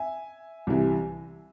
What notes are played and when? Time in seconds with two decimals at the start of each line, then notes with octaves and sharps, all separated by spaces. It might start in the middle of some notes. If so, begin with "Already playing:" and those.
Already playing: E5 G#5
0.67 C2 C3 E3